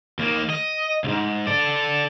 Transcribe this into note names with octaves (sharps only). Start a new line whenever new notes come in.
D#2 A#3
D#5
C#2 G#2
A4 D5